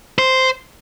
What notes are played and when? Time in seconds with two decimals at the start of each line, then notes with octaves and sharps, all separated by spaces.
0.19 C5